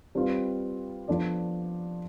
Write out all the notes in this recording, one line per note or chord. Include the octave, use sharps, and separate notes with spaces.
G3 C4 F4 B4
F3 B3 D4 A4 D5